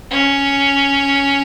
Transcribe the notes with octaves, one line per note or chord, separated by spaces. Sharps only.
C#4